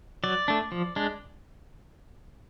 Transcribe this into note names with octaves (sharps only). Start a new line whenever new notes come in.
F#3 D5
A3 D4
F3
G#3 D4